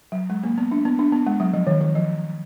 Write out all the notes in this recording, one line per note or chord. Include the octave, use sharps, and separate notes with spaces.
F#3
G#3
A#3
B3
D4
B3
D4
B3
G#3
F#3
F3
D#3
D#3
F3